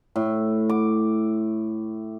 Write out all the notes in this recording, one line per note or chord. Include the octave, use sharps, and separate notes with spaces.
A2
D6